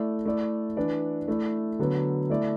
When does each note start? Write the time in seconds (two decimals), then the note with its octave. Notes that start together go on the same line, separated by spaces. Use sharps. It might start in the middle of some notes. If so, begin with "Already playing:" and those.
Already playing: A3 E4 D5
0.26 A3 E4 D5
0.77 E3 D4 B4 D5
1.28 A3 E4 D5
1.79 D3 F#3 B3
2.30 A3 E4 D5